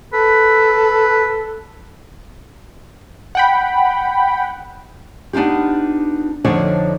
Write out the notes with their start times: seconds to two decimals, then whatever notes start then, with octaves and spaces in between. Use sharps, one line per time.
0.13 A4 B4
3.35 F#5 G5 B5
5.33 B3 D4 D#4 F4 G4
6.45 F2 D3 F3 D4 D#4 C#5